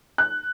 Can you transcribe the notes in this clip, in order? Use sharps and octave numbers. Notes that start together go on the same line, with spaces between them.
F#6